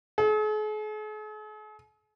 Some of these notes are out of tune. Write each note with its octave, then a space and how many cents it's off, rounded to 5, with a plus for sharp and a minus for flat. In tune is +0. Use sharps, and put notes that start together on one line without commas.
G#4 +45